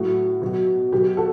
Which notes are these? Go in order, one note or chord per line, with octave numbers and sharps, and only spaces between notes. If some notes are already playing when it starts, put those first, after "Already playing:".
Already playing: A2 F#3 F#4
B2 F#3
B2 F#3 G4
F#4 A4